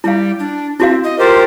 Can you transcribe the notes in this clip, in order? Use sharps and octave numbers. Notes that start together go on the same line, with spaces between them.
G3 E4 F5
D4
C4 E4 F#4 F5
D#5
F4 G4 A#4 C5